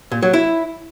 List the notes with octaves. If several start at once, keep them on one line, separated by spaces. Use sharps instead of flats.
A#2
F#3
E4